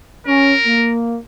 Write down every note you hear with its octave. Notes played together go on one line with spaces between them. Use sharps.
C#4 A#4
A#3